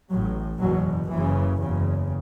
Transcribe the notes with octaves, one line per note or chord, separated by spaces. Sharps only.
A1 A2 F#3
F#1 E2 B2 F#3
F#1 F#2 C#3 E3
F#1 E2 C#3